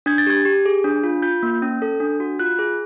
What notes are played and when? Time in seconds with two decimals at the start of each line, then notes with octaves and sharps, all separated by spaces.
0.06 D4 G#6
0.18 A6
0.26 G4 G#6
0.45 G4
0.65 G#4
0.84 D4
1.04 F4
1.22 F4 G6
1.43 A#3
1.62 C#4
1.82 A4
2.00 D4
2.20 F#4
2.39 F4 F#6
2.59 G#4